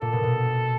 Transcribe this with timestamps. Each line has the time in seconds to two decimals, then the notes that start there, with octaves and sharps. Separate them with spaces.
0.01 A#2 A4
0.13 B2
0.24 B2